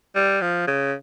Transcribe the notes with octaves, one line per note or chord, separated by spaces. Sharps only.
G3
F3
C#3